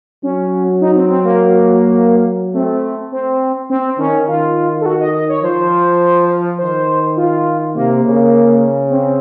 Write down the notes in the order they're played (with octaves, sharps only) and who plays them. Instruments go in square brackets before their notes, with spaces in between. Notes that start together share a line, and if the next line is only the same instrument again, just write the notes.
[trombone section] F#3 [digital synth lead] C#4
[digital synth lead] D#4
C4
C4
A#3
[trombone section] A3 [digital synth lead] C4
[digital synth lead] C4
C4
[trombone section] D#3 [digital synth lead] C#4
[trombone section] D#3 [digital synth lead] F4
[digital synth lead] A4
F#4
D#5
D#5
C#5
[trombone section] F3 [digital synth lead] C5
[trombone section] D#3 [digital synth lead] C5
[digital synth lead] F4
[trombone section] C3 [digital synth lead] A#3
[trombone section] C#3
[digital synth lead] C4